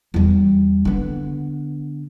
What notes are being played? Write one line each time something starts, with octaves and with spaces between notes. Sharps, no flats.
E2 G3
D3 B3